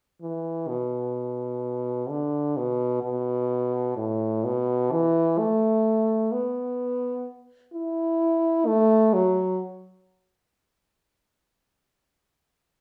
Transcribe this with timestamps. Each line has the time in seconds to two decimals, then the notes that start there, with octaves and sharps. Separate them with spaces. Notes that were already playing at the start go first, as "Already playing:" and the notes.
0.22 E3
0.68 B2
2.10 D3
2.57 B2
3.04 B2
3.97 A2
4.45 B2
4.92 E3
5.39 A3
6.32 B3
7.73 E4
8.67 A3
9.14 F#3